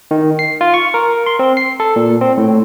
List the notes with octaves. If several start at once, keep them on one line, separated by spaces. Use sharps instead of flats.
D#3
C7
F4
C#6
A#4
C6
C4
C7
A4
A#2
C4
A2